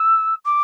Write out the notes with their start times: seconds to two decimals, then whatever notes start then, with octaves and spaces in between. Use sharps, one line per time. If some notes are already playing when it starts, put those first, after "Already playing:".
Already playing: E6
0.45 D6